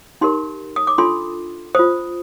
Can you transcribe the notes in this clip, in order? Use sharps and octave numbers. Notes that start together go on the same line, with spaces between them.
D#4 G4 A#4 C6
D#6
D6
D4 F4 A4 C6
F4 C5 D#6